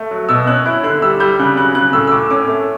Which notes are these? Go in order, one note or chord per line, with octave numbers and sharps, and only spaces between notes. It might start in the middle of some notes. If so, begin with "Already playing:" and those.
Already playing: A3
F#3
B2 E6
C#4 F#6
E4 F#6
D3 F#6
G3 E6
G3 G6
C#3 F#6
F#3 F#6
C#3 F#6
A2 E6
E6
A2 D6
C#4 D6
A3